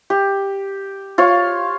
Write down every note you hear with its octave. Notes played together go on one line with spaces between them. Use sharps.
G4
F4 C#5 F5